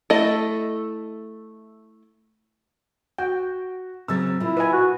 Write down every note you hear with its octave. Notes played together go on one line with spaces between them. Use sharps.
A3 E4 A4 D#5
F#4 G5
C#3 F#3 C4 E6 A6
A#2 E4 F4
B4 D#5 G#5
F#4